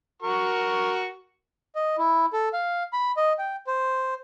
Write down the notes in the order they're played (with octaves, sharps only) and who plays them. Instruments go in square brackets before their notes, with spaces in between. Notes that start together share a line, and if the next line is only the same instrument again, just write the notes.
[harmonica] F#4 A#4 C#6
[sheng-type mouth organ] D#5
E4
A4
F5
B5
D#5
G5
C5